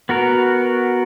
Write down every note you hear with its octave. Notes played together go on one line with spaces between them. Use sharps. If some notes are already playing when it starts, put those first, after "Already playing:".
B3 F#4 A#4